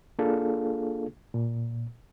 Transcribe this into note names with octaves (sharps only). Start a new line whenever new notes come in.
A#3 D4 F4 G#4 A4 F5
A#2